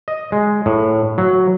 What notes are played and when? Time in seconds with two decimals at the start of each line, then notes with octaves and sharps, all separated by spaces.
0.08 D#5
0.32 G#3
0.66 A2
1.18 F#3